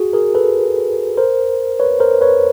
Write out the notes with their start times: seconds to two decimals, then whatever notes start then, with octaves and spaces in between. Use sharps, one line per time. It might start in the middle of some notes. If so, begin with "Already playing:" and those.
Already playing: F#4 G#4
0.13 G#4 A#4
0.35 A4 B4
1.17 A#4 C5
1.80 B4 C#5
2.00 A#4 C5
2.21 B4 C#5